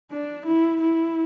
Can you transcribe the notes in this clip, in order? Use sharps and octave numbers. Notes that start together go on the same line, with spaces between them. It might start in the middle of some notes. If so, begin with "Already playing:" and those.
D4
E4
E4